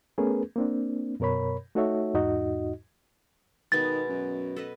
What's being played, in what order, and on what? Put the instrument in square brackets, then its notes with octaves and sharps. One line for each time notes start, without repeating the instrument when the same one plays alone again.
[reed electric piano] A3 B3 C#4 G#4 A#4 B4
A#3 C4 D4
F#2 B2 A#4 C#5 B5
A3 D#4 F#4 A4 C#5 E5
E2 G#2 D#4 F#4 D#5
[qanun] B2 G#3 B3 [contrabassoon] D#3 [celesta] A6
[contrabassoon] F#2
[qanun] A4 B4 D#5